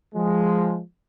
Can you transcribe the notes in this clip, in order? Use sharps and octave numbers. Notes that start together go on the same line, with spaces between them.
F3 G#3